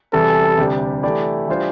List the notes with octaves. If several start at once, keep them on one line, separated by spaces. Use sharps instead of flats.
E2 C3 E3 G3 A4
D2 C3 G3 D4 G4
E3 A3 E4 G4 D5
E3 G3 D4 F4 C5